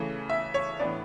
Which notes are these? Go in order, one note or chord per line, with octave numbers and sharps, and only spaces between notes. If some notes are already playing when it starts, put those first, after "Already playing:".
Already playing: C#3 E3 A3 C#4
E5
C#5
A2 E3 B3 D4 D5